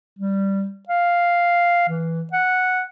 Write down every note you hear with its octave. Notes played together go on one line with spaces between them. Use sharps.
G3
F5
E3
F#5